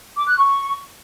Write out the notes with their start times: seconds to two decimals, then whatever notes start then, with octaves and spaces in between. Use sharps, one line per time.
0.16 D6
0.26 F#6
0.37 C#6